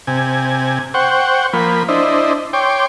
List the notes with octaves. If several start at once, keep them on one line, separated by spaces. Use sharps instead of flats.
C3 G#5
C5 F#5 G5 C#6
F3 A#3 B5
D4 E4 C5 D#5
C#5 G5 C6 D6